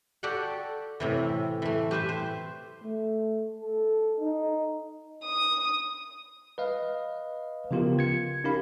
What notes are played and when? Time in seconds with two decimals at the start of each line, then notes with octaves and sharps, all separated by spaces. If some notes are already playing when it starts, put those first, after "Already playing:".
0.23 F#4 G4 A4 D5 F#5
1.00 A2 C3 E3
1.62 E3 A3
1.91 G4 B4 C5 E5
2.09 C5
2.83 A3
3.60 A4
4.20 D#4
5.24 D#6
6.58 B4 D#5 F5
7.71 C#3 F3 B3 F4 G4 A#4
7.99 G#6 C#7
8.44 C#4 D#4 G4 A#4 F5 B5